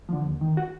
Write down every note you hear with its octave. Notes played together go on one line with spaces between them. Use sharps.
D3 F3
D#2
D#3
F#4